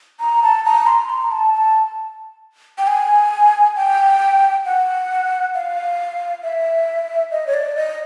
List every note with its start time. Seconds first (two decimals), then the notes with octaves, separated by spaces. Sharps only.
0.20 A#5
0.43 A5
0.65 A#5
0.87 C6
1.10 A#5
1.32 A5
1.54 A5
2.78 G5
2.87 G#5
3.76 G5
4.65 F#5
5.54 F5
6.43 E5
7.31 D#5
7.47 C#5
7.54 D5
7.76 D#5